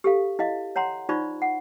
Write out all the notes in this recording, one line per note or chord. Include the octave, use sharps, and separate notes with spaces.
G4 A4 F5
E4 D#5 F5
C#5 F#5 A#5 C6
D#4 F4 C5 D5 B5 C#6
F#5